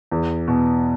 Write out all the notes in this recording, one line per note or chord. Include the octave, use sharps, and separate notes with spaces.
E2
B2